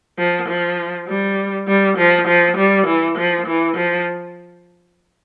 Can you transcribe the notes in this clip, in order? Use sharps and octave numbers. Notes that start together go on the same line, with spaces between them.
F3
F3
G3
G3
F3
F3
G3
E3
F3
E3
F3